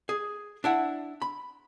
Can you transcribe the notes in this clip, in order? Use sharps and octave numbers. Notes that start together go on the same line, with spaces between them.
G#4
D4 E4 F#5
B5